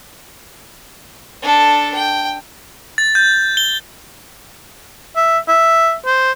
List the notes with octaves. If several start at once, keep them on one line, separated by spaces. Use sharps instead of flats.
D4 A4
G5
A6
G6
G7
E5
E5
C5